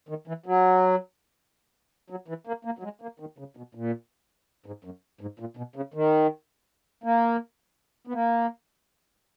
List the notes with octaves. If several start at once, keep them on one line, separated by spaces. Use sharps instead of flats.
D#3
E3
F#3
F#3
E3
A#3
A#3
F#3
G#3
A#3
D#3
C#3
B2
A#2
G#2
F#2
G#2
A#2
B2
C#3
D#3
A#3
B3
A#3